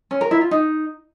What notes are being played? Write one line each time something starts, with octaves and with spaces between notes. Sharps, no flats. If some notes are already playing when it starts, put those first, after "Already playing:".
C#4
A#4
E4
F4
D#4